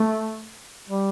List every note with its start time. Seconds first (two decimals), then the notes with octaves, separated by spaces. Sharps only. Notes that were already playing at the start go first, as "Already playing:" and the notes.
Already playing: A3
0.90 G3